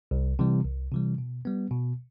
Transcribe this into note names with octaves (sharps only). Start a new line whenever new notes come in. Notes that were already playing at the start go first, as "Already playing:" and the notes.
C2
C3 E3 G3
C2
C3 E3 G3
B2
G3 B3
B2